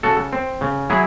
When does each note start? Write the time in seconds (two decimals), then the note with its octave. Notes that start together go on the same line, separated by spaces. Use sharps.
0.03 C#3 F#4 A4
0.33 C4
0.61 C#3
0.90 F#3 E4 G#4